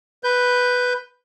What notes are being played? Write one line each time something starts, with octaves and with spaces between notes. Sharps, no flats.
B4 G6